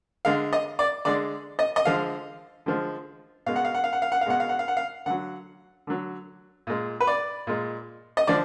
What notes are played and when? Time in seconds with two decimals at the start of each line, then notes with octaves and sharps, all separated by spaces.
0.25 D3 G#3 F5
0.53 D#5
0.79 D5
1.05 D3 G#3 D5
1.59 D#5
1.76 D#5
1.85 D3 F3 G#3 F5
2.66 D3 F3 G#3
3.46 B2 G#3 F5
3.56 F#5
3.65 F5
3.74 F#5
3.84 F5
3.93 F#5
4.02 F5
4.12 F#5
4.21 F5
4.26 B2 G#3 F#5
4.40 F5
4.49 F#5
4.59 F5
4.68 F#5
4.77 F5
5.06 D3 F#3 F#5
5.87 D3 F#3
6.67 A#2 G#3
7.00 B4
7.07 D5
7.47 A#2 G#3
8.17 D#5
8.27 D3 F3 D5